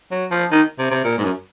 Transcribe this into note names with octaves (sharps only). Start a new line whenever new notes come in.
F#3
F3
D#3
C3
C3
A#2
G#2
F#2